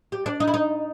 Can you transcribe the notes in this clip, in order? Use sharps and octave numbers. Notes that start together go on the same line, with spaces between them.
G4
D4
D#4
E4
D#4